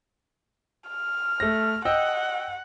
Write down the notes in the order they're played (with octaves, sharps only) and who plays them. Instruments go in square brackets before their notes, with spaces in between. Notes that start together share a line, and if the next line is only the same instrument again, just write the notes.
[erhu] F6
[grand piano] A3 A#6
[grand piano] D#5 G5 E6 [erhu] F#5